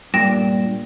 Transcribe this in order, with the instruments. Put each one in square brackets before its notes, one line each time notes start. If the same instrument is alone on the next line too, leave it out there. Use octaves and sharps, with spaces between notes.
[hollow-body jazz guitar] G2 A#2 [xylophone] G5 A#6 E7